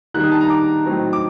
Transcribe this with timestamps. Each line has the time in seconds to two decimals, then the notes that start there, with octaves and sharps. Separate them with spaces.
0.14 D#3 G3 A#3 D#4 F#6
0.23 D#6
0.31 A5
0.41 A#5
0.50 D6
0.85 A2 F#3 C4 D#4
1.13 D6